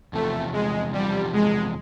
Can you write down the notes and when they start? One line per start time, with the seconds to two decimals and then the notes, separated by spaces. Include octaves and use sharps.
0.13 E2 C3 F3 A3
0.53 G#3
0.93 E2 C3 F3 G3
1.33 G#3